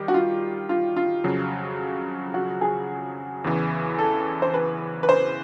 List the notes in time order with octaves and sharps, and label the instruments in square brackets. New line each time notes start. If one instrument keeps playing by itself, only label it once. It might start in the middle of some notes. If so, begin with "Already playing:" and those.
Already playing: [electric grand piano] D#3 G3 G4
[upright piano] F#4
F4
F4
F4
[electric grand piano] F2 C#3 F#3
[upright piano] F#4
G#4
[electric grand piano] E2 C#3 E3
[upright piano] A4
C5
B4
B4
C5